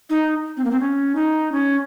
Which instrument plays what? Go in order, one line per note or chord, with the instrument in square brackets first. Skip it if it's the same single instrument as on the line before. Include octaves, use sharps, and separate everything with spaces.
[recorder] D#4
C4
A#3
C4
C#4
D#4
C#4